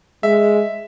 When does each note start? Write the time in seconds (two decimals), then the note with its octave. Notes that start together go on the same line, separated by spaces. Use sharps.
0.23 G#3 E5